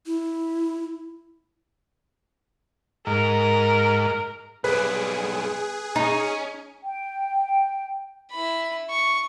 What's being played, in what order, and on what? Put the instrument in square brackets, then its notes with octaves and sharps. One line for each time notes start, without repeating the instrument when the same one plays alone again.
[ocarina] E4
[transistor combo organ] G#2 [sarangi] A#4
[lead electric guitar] B1 G3 [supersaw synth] G#4 [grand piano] B4
[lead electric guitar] C#4 [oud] D#4
[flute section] G5
[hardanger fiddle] E4 B5
C#6